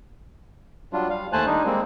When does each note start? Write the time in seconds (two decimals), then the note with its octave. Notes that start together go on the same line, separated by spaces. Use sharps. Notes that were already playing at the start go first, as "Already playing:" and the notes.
0.93 F#3 G3 D4 F4
1.10 G3 F5
1.33 D#2 A3 C5 G#5 A5 F#6
1.46 G3 D4 D#4
1.65 G3 G#3 A#3 C4